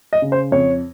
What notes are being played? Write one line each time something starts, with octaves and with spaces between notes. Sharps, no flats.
D#5
C#3
C5
F2 C#5